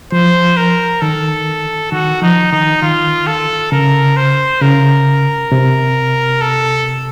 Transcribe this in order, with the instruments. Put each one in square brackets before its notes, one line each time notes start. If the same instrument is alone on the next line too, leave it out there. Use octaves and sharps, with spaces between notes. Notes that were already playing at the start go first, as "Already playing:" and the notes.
[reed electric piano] F3 [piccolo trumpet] C5
[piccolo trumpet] A#4
[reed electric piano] D#3 [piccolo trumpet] A4
[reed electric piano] D#3 [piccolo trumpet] F#4
[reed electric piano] F3 [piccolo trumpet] D#4
[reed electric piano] D#3 [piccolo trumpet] D#4
[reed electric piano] D#3 [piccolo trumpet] F4
[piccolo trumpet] A4
[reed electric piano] C#3 [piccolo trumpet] A#4
[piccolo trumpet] C5
[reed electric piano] C#3 [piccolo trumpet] A#4
[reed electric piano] C3
[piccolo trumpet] A4